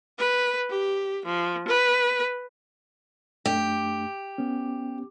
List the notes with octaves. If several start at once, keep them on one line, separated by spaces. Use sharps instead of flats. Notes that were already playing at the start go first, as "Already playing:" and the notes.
B4
G4
F3
B4
F#2 A3 D4 G4
B3 C#4